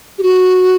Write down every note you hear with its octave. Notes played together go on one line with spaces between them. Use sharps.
G4
F#4